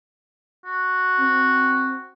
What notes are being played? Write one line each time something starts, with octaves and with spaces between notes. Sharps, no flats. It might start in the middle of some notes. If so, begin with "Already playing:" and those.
F#4
C4